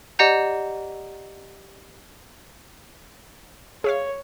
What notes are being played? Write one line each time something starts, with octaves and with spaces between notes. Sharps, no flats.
G4 D5 D#5 F#5 A#5 G6
G#4 C#5 E5 F5